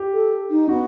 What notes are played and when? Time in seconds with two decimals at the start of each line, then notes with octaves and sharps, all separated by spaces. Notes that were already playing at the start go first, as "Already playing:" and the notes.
Already playing: G4
0.13 A4
0.50 D#4
0.68 B3 F#4